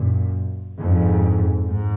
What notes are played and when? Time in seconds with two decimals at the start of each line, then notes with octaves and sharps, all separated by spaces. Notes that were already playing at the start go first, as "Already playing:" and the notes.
Already playing: F#2 A#2
0.81 F2 G#2
1.66 G#2